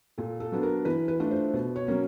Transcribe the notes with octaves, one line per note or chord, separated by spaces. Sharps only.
A#2 A4
A4
F#3 B3 D4
A#4
E3 B4
B4
A3 D4 F4
C5
B2
C#5
F#3 A#3 C#4